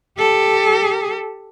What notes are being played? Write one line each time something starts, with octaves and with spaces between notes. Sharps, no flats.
G4 A4